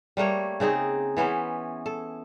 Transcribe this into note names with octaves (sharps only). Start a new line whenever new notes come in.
G3 A3 A#3 C#5
C#3 C4 D#4 G#4
E3 B3 C#4 C5
A4